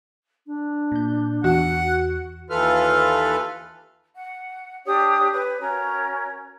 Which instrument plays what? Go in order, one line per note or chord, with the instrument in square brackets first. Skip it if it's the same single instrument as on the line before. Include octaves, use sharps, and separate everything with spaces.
[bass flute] D4
[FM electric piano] A#2 G6
[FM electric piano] E2 [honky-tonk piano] F#4 [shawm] F#5
[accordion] D#2 E3 F4 A4 B4 F6
[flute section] F#5
D4 G4 C#5 D#6
B4 C#5
C#4 F#4 A#4 C#5